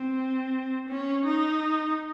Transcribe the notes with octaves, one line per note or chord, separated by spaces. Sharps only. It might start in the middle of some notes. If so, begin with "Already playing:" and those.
Already playing: C4
C#4
D#4